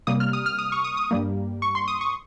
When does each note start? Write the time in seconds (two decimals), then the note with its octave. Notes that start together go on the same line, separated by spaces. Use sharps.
0.07 C3 G3 A#3 D#6
0.20 F6
0.33 D#6
0.46 F6
0.59 D#6
0.72 C#6
0.84 D#6
0.97 D#6
1.11 G2 G3 A#3
1.62 C#6
1.75 C6
1.88 D#6
2.01 C#6